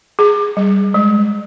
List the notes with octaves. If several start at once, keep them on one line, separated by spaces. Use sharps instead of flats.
G#4
G3
G#3